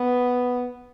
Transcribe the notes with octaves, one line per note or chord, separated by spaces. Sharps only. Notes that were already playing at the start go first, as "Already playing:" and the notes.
Already playing: B3